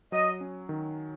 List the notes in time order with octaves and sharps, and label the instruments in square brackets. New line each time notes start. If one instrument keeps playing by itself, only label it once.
[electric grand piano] F#3 [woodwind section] D#5
[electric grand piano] C#4
D#3